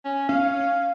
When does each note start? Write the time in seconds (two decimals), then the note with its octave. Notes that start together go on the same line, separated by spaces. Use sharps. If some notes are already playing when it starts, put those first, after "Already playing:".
0.05 C#4
0.29 C#4 F5